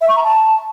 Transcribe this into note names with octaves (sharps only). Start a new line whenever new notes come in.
E5
C#6
A#5
A5